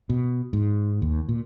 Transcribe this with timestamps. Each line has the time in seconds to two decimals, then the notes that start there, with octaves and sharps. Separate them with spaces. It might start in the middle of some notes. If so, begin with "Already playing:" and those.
0.10 B2
0.53 G#2
1.02 D#2
1.29 A#2